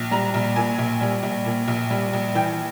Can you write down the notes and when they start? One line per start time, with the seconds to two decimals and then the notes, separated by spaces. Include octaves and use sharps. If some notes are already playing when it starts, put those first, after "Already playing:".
Already playing: A#1
0.11 G3 A#5
0.34 A#1
0.56 A#2 G#5
0.78 A#1
1.01 G3
1.23 A#1
1.46 A#2
1.68 A#1
1.91 G3
2.13 A#1
2.35 E3 G5